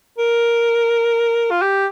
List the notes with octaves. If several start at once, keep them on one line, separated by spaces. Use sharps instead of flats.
A#4
F4
G4